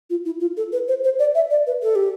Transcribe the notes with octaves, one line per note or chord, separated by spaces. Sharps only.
F4
E4
F4
A4
B4
C5
C5
D5
E5
D5
B4
A4
G4